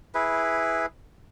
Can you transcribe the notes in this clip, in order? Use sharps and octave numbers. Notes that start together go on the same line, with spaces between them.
E4 G#4 B4